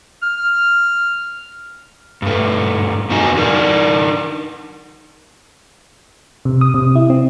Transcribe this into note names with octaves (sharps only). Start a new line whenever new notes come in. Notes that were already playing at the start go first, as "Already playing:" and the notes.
F6
G2 A3
F2 B2 D#4 F#4 D#5 G#5
D4 D#4 A#4 D5
C3
D#6
C3
E4
C4